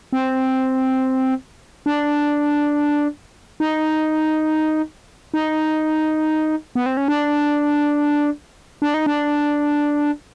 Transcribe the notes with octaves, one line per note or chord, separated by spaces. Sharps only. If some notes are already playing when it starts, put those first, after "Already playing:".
C4
D4
D#4
D#4
B3
C4
C#4
D4
D4
D#4
D4